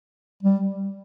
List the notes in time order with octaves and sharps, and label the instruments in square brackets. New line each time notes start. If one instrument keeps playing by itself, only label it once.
[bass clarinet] G3